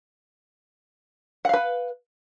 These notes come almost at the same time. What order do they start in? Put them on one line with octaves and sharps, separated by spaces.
F#5 F5 B4